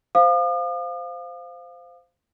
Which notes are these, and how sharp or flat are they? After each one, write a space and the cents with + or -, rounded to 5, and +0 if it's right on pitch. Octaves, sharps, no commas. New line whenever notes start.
C5 -15 F5 +0 D#6 -45